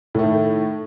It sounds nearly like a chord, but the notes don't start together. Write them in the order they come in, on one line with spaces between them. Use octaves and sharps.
A2 A3 D#3